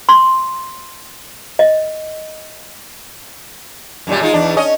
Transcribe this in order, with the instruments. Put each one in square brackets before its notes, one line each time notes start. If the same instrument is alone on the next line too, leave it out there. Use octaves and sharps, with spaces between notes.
[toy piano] C6
D#5
[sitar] F#2 A#2 G3
G#3 D#4 F4
E2 D4
C#4 D#5